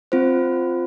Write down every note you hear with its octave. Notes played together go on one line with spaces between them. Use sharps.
C4 F4 C5